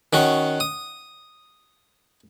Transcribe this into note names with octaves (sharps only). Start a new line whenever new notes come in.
D#3 C#4 F#4
D#6